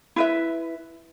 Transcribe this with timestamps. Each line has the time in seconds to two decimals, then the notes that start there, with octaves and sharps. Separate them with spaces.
0.16 E4 B4 E5